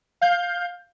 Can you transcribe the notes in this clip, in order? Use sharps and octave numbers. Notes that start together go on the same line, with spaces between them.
F5 G6